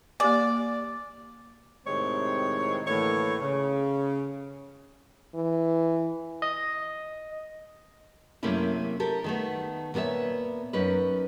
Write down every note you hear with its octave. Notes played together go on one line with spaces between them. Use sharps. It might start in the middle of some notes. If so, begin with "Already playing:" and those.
A#3 G4 D5 G#5
A2 C3 D#3 G#3 C4 C#5
A2 D3 E3 A3 A#3 C#5
C#3
E3
D#5
F#2 C3 A3 A#3 C#4 E4
G4 A4 A#4
D#3 A3 B3
A#2 B3 F#4 C#5 E5
F#2 C#4 D#4 B4